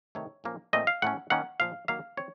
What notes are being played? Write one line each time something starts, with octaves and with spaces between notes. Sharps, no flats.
C3 D#3 A3 C#5
A#2 F3 A#3 C#4
A#2 A3 C4 D#5
F5
A2 A3 C#4 F#5
D#3 A#3 C#4 F#5
A#2 F3 A#3 F5
D#3 F#3 A#3 F5
C4 C#5